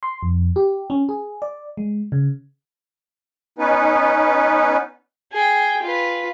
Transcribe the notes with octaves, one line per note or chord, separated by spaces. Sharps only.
C6
F2
G4
C#4
G#4
D5
G#3
C#3
B3 C#4 D#4 B4
G#4 G5
F4 B4